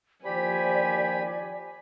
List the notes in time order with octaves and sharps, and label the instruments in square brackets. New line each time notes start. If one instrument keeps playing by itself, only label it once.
[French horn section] D#2 F3 C5 [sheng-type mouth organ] G4 B5 [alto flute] D5 [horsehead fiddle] G#5